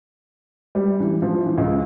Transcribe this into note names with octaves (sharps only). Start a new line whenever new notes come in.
G3
E3
F3
E3
C#2